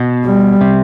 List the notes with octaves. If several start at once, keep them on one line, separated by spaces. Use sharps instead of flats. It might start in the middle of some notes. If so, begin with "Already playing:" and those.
Already playing: B2
G3
C3